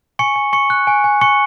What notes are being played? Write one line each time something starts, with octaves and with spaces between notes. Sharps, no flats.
G#5 C#6 C#7
G#5
C#6 C#7
F#6
G#5
G#5
C#6 C#7